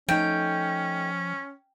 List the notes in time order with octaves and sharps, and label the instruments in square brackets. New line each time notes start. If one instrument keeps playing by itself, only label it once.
[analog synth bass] F3 [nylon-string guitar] A3 D#4 [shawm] C#4 [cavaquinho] G5